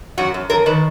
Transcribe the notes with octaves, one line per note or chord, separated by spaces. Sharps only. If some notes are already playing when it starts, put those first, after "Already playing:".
F#2 F#4
F#2
F#2 A#4
D#3 B4